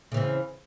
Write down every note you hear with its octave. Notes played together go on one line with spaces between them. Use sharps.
C#3 E3 C4